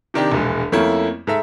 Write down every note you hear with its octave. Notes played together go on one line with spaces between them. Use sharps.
C3 D#3 D4 G4
E1 A#1 G#3
F2 A3 A#3 C#4 E4
G#2 A4 E5